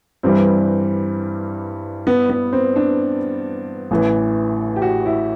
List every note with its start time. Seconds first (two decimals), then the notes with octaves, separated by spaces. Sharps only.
0.23 G2 E3 G3 C4
2.07 B3
2.30 B3
2.53 C4
2.76 D4
3.91 A1 A2 E3
4.76 G4
4.82 F#4
5.05 E4